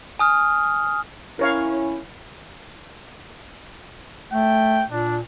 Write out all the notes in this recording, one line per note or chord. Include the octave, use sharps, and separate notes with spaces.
G#5 D#6 F6
C#4 E4 A#4 C#5 F5
A3 G5
A#2 D4